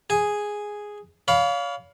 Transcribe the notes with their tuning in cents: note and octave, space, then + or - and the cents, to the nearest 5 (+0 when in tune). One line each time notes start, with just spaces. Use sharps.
G#4 +0 G#5 +0
C#5 +45 F5 +10 B5 +0